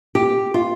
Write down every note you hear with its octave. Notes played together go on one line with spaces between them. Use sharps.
G4
F4